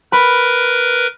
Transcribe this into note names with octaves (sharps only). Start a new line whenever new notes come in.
A#4 B4 B5